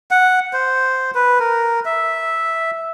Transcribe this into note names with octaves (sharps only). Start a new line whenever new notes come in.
F#5
C5
B4
A#4
E5